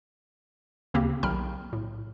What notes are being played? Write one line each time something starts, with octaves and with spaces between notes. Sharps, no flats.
D2 C#3 A#3 C4 G4
B1 D#3 G5 A#5 B5 F6
A2